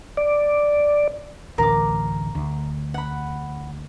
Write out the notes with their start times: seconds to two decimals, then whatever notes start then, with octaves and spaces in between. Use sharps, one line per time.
0.17 D5
1.58 A1 D2 A#4 D6
2.35 D2
2.94 F#5 B5